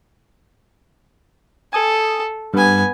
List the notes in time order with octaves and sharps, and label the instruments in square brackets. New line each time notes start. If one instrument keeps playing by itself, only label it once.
[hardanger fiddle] A4 [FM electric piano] G#5 D#6
[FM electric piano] G2 [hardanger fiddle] B3 G#5